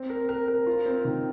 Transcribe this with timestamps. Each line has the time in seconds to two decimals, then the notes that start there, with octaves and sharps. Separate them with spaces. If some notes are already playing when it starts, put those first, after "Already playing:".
Already playing: C4
0.10 A#4
0.29 A#4
0.48 A#4
0.67 F4
0.86 C4
1.05 D#3